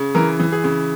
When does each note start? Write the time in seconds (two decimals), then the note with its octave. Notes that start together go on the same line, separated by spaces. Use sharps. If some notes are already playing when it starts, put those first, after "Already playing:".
Already playing: C#3
0.15 E3 A#4
0.39 E3
0.52 G#4
0.64 C#3